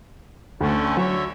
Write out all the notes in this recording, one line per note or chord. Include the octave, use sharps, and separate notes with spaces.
D2 D3 A3 C#4
D3 F#3 C#5 E5